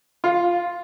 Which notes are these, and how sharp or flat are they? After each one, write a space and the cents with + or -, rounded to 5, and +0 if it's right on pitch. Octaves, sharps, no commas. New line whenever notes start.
F4 +0 F5 +25